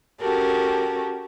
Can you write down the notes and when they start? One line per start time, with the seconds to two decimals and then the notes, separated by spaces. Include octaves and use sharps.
0.20 C#4 F#4 G4 A4 A#4